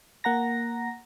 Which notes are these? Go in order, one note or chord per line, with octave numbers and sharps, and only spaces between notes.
A#3 F#5 A#5 A#6